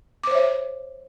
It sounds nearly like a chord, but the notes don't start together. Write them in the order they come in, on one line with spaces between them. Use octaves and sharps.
D6 C5 C#5 E5